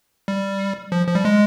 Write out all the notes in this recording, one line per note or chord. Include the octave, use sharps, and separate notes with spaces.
G3
F3
F3
G3
G#3